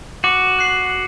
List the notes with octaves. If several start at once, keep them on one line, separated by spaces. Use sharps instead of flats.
F#4 D6
F#6 C7 F#7